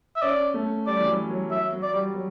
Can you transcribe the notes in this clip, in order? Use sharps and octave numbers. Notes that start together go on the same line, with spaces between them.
E5
C#4 D5
A3
G3 D5
E3
F#3
F#3
F#3 E5
F#3
D5
G3
F#3